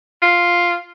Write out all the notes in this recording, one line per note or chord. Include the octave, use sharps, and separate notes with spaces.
F4